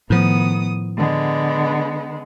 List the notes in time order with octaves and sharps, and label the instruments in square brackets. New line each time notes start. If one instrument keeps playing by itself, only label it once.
[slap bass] A2 F3 [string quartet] D#3 B3 D#6
[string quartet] D3 G#3 B3